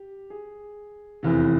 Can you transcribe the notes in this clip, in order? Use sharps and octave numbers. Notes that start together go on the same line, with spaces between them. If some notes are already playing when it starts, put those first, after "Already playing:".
Already playing: G4
G#4
F1 E2 C3 E3